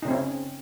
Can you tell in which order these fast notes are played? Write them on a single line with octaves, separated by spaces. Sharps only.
D#4 C#3 C4 C#4